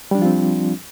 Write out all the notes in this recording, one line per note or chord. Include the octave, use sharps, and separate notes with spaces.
F3 G3 C4 D4 F4